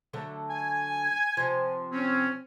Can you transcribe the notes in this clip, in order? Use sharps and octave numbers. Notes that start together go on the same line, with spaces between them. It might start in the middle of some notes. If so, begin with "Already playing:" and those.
D3 F#3 A3
G#5
C3 F3
C4 C#4